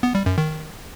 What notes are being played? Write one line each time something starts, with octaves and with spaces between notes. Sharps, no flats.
B3
G3
F#2
D#3